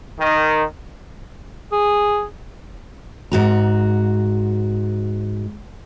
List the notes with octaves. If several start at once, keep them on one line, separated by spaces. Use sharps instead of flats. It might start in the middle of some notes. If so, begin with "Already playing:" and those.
D#3
G#4
G#2 F#4 A#5